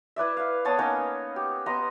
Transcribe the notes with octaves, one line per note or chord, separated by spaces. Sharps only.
E4 B4 D5 E5
B4 F5
B3 C#5 A5 D#6
A#3 B3 C#4 D#4
G4
B3 D#5 A#5 C6